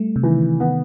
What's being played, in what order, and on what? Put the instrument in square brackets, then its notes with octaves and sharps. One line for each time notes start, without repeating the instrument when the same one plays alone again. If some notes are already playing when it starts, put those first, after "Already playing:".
Already playing: [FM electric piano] G3 A3
C3
[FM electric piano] D#3 [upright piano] E3
[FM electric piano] C3
[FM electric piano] D#3 [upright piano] B3